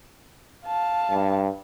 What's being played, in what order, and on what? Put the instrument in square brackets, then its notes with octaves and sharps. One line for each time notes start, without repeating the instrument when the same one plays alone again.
[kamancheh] F5 A5
[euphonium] G2